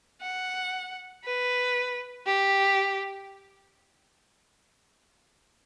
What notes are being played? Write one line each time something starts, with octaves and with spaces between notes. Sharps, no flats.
F#5
B4
G4